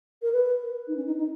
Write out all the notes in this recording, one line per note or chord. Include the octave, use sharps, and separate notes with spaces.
A#4
B4
D#4
C#4
D#4
D#4